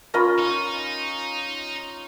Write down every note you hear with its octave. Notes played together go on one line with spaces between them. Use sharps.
C#4 F4 A#4 D#5 B5
D#4